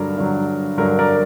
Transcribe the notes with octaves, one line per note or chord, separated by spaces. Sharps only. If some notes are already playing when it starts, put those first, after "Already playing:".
Already playing: G2 D3 F#3 A#4
G2 D3 F#3
G2 D3 F#3 A#4
A#4 D5